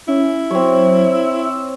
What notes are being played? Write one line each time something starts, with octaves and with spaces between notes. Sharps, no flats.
C#4 E4
F#3 C4 C#5
E6